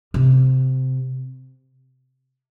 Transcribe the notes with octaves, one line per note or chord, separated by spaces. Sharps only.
C3